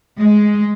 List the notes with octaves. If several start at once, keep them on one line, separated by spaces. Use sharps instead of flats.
G#3